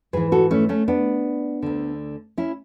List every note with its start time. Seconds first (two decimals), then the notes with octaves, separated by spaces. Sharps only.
0.13 G#2 E3 G#4 B4
0.32 F#4 A4
0.51 A3 C#4
0.69 A3 C#4
0.88 B3 D4
1.63 D2 D3
2.37 C#4 E4